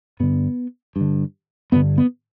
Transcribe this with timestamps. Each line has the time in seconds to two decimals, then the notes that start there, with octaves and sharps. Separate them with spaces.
0.20 G2 D3 B3
0.96 G2
1.01 D3
1.72 G2 D3 B3
1.98 B3